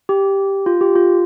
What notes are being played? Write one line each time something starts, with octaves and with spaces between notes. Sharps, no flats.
G4
F4
G4
F4